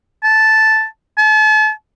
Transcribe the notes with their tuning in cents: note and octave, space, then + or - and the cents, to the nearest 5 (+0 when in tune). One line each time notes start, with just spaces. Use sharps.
A5 -5
A5 -40